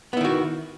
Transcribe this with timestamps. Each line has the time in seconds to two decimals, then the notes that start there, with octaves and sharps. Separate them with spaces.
0.13 B3
0.17 E4
0.21 D#3
0.25 F#4